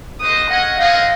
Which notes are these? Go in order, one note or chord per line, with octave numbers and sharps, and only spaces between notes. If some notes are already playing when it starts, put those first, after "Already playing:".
F#4 C5 D#5 D#6
C#4 G#4 D#5 F#5
C4 D#4 G#4 D#5 F5 F#5